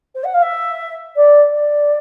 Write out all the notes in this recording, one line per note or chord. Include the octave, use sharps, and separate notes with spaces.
C5
F#5
F5
E5
D5
D5